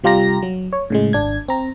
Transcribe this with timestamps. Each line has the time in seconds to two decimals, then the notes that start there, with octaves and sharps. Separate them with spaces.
0.04 C3 G3 F4 G4 A#5 A#6
0.43 F#3
0.73 C#5
0.90 A2 C#3 G#3
1.13 G#1 D4 G#6
1.48 C4 A#5